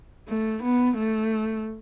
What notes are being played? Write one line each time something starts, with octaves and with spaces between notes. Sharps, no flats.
A3
B3
A3